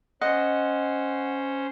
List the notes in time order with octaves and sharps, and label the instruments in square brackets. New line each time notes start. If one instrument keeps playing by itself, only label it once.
[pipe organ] C#4 C5 [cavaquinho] D#5 [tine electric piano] F#5